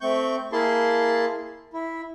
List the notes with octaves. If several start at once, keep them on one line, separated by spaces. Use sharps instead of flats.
A3 C4 C#6 G6
A#3 E4 G#4 A5 C6
E4